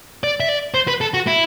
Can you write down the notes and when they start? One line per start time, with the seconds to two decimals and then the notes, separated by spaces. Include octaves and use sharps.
0.24 D5
0.40 E5
0.49 D5
0.74 C5
0.88 B4
1.01 A4
1.14 F#4
1.27 E4